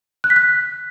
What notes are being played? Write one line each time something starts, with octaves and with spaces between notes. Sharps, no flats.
F#6
B6
F#6